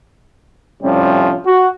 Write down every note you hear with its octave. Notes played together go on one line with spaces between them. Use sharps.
A2 C3 F3 G3 C#4
F#4